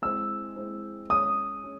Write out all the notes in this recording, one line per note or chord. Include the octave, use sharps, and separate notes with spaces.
G#3 C4 E4 C5 E6
G#3 C4 E4 C5
G#3 C#4 G#4 C#5 D#6
G#3 C#4